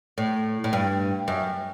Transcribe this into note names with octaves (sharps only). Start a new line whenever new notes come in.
A2
A2
G2
F#2